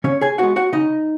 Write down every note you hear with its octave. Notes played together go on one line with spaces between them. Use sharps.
C#3 C#4 C#5
G#4 G#5
G#3 B3 F#4 F#5
F#4 F#5
C#3 D#4 D#5